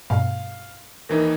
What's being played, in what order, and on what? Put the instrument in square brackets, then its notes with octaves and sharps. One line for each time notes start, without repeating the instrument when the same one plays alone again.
[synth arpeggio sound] G2 B2 A3 [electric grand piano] F5
[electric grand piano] D#2 E3 D#4 [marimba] A#4